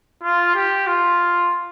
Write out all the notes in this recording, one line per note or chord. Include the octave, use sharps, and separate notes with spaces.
F4
G4
F4